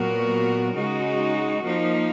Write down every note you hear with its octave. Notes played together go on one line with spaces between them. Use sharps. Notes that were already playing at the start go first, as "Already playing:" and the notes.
Already playing: A#2 F#3 B3 F#4 A#4
C#3 G#3 D#4 F#4
F3 A#3 D#4